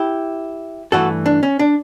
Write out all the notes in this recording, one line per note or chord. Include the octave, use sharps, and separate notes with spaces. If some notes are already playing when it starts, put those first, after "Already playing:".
Already playing: E4 G4
G2 E3 A3 F#4 A4
D4
C#4
D4